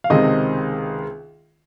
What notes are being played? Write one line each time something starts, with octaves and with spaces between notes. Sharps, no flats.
F5
C#2 C3 D#3 G#3 C4 D#5